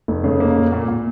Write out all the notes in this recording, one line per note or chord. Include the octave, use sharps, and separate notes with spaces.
F1
C#3
A#3
A#2
A#2
A#2